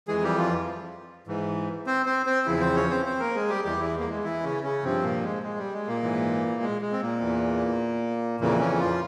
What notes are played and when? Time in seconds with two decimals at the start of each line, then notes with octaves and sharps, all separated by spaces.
0.08 F2 E3 G#3 G#4
0.23 G3 G4
0.38 F3 F4
1.27 G#2 E3
1.87 C4 C5
2.06 C4 C5
2.26 C4 C5
2.46 E2 C#3 E3 F3 E4
2.61 C4 C5
2.76 C#4 C#5
2.90 C4 C5
3.05 C4 C5
3.20 A#3 A#4
3.35 G#3 G#4
3.50 G3 G4
3.64 E2 E3 G3 G4
3.80 E3 E4
3.99 A#3
4.10 G#3
4.24 E3 E4
4.44 C#3 C#4
4.64 C#3 C#4
4.83 G2 C3 F3 C4
5.03 A#2 A#3
5.23 G#3
5.43 G#3
5.58 G3
5.73 G#3
5.87 A#2 A#3
6.03 G#2 E3
6.62 G#3
6.82 G#3
6.92 C4
7.02 A#2 A#3
7.21 E2 E3
8.40 F2 A#2 C#3 E3 A#3
8.59 C#3 C#4
8.79 F3 F4